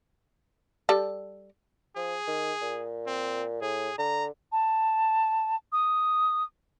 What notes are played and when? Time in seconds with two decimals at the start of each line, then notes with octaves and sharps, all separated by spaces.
0.89 G3 A4
1.96 F3 G#4
2.27 D#3
2.62 A#2
3.07 C4
3.62 A2 G#4
3.98 D3 A#5
4.52 A5
5.72 D#6